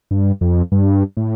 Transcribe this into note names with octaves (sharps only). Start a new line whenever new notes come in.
G2
F2
G2
A2